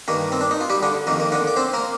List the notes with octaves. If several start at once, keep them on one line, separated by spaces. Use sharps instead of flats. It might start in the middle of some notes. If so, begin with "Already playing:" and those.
G2 D#3 A#3
C4
D4
D#4
F4
G3 G4
D3 D4
F2 D#3 A#3
A#3
D3 D4
D5
C4 C5
A#3 A#4